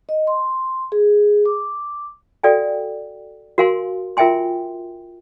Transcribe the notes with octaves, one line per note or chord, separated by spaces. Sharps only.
D#5
C6
G#4
D6
F#4 A4 D5 F5 G5 G#5
F#4 A#4 F5 G#5 C6
F4 A#4 E5 G5 G#5 C6